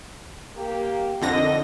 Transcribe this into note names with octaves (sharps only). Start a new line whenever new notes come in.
A#3 G4
F2 D3 D#3 D#5 A#6